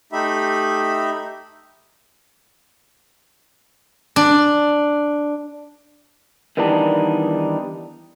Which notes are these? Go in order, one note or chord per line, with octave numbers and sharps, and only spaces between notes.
A3 D#4 G4 E5 B5
D4
D#3 E3 G3 B3 D4 D#4